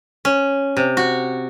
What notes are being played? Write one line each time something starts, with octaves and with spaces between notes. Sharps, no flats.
C#4
C3
F#4